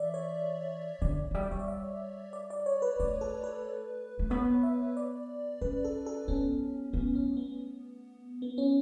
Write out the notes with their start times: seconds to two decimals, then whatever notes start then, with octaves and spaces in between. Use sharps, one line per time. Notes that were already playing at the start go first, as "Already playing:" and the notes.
Already playing: E3 D5 E5
0.14 C#5
1.02 D3 D5
1.31 F#3
1.35 G3 E5
1.43 D5
1.51 G3 C#5
1.59 D5
1.68 E5
2.33 D5
2.50 D5
2.66 C#5
2.82 B4
3.00 A3 D5
3.21 A4
3.43 B4
4.19 A3
4.30 B3 C#5
4.63 E5
4.97 D5
5.61 C#4 B4
5.85 A4
6.06 A4
6.28 B3 C#4
6.93 A3 B3
7.15 C#4
7.37 B3
8.42 B3
8.58 C#4